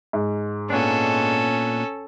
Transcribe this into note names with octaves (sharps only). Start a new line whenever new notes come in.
G#2
A#2 B3 C#4 D4 A4